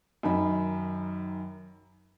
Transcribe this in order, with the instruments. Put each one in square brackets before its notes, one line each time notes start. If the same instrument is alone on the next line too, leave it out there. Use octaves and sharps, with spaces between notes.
[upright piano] F#2 D#3 D#4 B5